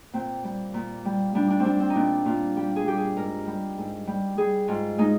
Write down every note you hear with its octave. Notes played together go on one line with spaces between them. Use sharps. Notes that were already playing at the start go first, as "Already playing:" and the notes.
A#2 C4
G3
A#2
G3
G3 D4
D4
C4
G3 D4
C4
D#4
A#2 D4
A#2 F4
G3 G4
G#4
G3 G4
G#4
G#2 A#4
G3
G#2
G3
G3 G#4
G#2 F4
G#3 D#4